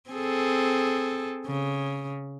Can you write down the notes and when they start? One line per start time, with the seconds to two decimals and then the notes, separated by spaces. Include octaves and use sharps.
0.10 C4 G#4 A4
1.47 C#3